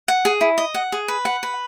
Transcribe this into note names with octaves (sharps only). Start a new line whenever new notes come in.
F#5
G#4
E4
D#5
F#5
G#4
B4
F#5
B4